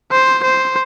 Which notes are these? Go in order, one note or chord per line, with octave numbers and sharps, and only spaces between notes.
C5
C5